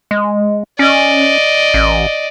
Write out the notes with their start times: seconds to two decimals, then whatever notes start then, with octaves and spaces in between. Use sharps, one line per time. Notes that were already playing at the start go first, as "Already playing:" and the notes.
0.11 G#3
0.79 C#4 D5 D#5
1.74 A1